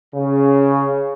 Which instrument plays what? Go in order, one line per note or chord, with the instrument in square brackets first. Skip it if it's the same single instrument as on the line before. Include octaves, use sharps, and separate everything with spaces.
[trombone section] C#3